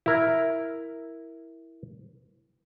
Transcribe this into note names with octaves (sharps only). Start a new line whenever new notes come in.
E4 A#4